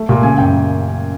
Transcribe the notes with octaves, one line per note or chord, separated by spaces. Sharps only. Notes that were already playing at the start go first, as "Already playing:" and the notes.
Already playing: A3
A#2
C#3 G#5
F#2 G5